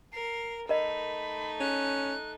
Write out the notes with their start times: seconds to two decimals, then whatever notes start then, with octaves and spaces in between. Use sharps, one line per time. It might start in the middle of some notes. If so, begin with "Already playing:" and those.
0.13 A#4 C7
0.69 A3 D#4 A#4 D#5 B5
1.60 C#4 F#6